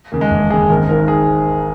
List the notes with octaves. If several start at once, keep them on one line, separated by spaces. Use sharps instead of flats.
D#2 C#3 A#3
G#3
E1
D#2 C#3 G#4
G#1 A#4
G#2 D#3 A#4
G#4